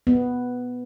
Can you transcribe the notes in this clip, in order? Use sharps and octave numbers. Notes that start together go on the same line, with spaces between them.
B3